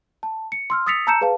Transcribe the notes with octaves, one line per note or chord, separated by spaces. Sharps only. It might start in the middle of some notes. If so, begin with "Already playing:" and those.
A5
C#7
C6 E6 F6
D#6 E6 A6 B6 C#7 F7
A5 A#5 E6 G6 C#7 E7
G#4 B4 F5 A5